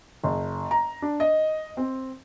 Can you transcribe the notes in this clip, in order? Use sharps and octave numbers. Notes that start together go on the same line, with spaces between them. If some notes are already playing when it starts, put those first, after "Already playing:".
F#1
A#5
D4
D#5
C4